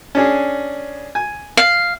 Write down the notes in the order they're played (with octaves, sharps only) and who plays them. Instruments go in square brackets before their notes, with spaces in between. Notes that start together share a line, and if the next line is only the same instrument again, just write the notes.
[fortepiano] C#4 D4 G#4
G#5
[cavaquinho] F5